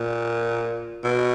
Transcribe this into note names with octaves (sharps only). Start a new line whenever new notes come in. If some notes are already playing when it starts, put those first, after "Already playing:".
Already playing: A#2
B2